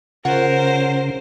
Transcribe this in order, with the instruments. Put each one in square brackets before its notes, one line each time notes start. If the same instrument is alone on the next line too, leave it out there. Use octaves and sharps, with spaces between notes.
[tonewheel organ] C#3 [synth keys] F4 C#5 F#5 [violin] A#4 C5